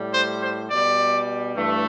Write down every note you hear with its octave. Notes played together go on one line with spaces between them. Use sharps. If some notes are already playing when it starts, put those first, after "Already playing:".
Already playing: A2 G3
C5
C5
B2 G3 D5
G2 E3 A3